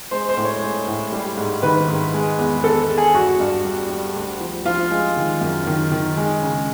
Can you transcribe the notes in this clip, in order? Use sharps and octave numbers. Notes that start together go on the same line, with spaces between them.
G#3 C5
C5
A2
C#5
G#3
A2
G3
G#2
D#3 B4
G#2
G#3
E2
E2 A4
E2
G#4
G2 F#4
G2
G3
G3
D2
F3
F3 F4
G#3
D#3
F#2
D#3
D#3
G#3
C#3